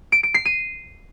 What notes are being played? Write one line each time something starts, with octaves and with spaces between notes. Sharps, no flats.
D7
D7
C7
D#7